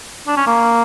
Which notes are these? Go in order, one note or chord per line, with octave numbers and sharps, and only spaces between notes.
D4
C#4
A#3